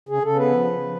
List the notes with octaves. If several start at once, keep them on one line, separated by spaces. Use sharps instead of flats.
C#3 G#4
C#3 A4
B3 B4
F3
C#3
F3